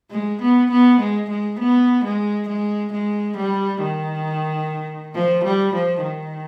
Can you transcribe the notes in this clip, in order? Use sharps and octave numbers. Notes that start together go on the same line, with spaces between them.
G#3
B3
B3
G#3
G#3
B3
G#3
G#3
G#3
G3
D#3
F3
G3
F3
D#3